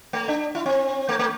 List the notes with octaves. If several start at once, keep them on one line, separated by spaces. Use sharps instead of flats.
A3
D4
E4
C4
A3
A3